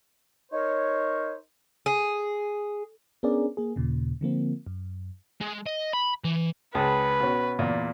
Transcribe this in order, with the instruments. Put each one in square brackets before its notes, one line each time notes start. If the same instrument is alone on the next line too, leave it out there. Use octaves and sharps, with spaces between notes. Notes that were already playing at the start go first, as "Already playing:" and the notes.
[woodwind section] D#4 A#4 C5 C#5
[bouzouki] G#4
[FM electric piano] B3 C#4 D4 G#4 A#4 D5
A#3 G#4
D#2 A#2 C#3
D3 F3 A#3 C4
F#2
[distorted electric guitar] G#3
D#5
B5
E3
[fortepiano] C#2 G#4 A5 [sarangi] B4
[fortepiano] B2 C#4
E2 A#2